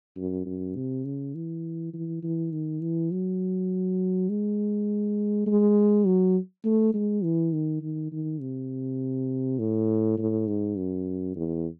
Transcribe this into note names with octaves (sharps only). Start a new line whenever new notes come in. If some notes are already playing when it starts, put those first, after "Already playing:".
F#2
F#2
C3
C#3
E3
E3
E3
D#3
E3
F#3
G#3
G#3
F#3
A3
G#3
E3
D#3
D#3
D#3
C3
A2
A2
G#2
F#2
E2